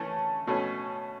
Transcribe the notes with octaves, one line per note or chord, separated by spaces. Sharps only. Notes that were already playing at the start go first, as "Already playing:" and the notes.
Already playing: E3 A3 C#4 A5
B2 A3 C#4